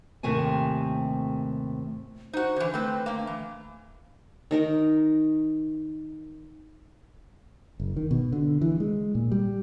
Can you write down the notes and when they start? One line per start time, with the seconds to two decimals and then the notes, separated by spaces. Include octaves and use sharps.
0.23 D#2 A2 C3 A3 C4 G#5
2.33 D#4 F#4 C5
2.56 D3 E3
2.74 A3 C4 A4 B4
3.06 D3 A#3
3.27 E3
4.51 D#3 D#4 A#4
7.80 F#1
7.97 D#3
8.11 B2
8.32 D3
8.61 E3
8.80 G#3
9.15 A#2
9.32 G3